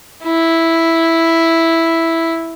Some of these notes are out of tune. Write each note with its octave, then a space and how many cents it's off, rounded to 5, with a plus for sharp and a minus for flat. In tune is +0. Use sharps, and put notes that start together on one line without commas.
E4 -5